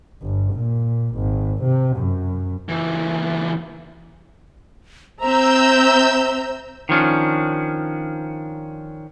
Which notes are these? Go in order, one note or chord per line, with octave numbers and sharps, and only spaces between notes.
G1
A#2
G#1
C3
F#2
C#2 E3
C4 C5 E5 A#5 E6 G6
D#3 F3 C#4 D4